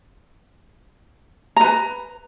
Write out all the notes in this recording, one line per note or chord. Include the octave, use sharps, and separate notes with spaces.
B4 A#5